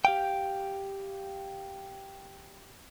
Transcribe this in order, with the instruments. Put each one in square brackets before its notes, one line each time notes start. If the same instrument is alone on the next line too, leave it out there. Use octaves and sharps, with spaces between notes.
[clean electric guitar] G4 F5 G5